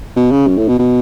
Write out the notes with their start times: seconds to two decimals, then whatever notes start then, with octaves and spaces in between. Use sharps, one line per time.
0.16 B2
0.31 C#3
0.47 F#2
0.58 A2
0.68 B2
0.79 B2